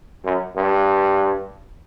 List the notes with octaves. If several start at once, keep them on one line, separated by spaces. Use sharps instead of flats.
F#2
G2